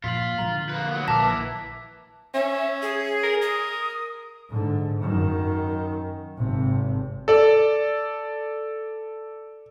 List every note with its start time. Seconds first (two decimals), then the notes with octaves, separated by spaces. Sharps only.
0.04 A#2 F3 F4 B6 F#7
0.38 D3 F3 G#3 A#5 F#7
0.69 A#3 B4
0.91 F#3 B3
1.08 A#1 A#3 A#4 A5 D6 E6 B6
1.20 E3
2.34 C#4 E5
2.82 G#4
3.23 A#4
3.42 D#6
4.49 G#2 D3
5.00 F#2 D#3
6.37 G#1 C3
7.28 A4 D5